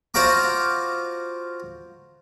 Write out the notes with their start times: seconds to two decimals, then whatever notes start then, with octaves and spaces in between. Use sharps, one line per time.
0.14 F4 F#4 C5 F5 A#5 D6